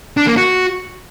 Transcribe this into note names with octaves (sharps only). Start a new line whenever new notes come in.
D4
A#3
F#4